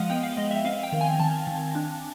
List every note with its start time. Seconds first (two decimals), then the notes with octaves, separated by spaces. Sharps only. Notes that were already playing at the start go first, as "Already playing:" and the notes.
Already playing: F3 G#3 D#5 F5 F#5
0.10 B3 G5
0.23 F5
0.37 G#3 D#5
0.51 E5
0.64 C4 F5
0.83 G5
0.92 D#3
1.01 G#5
1.19 D#3 A5
1.47 D#3
1.75 D4